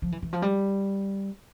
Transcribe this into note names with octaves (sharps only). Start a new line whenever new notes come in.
F3
E3
E3
F3
G3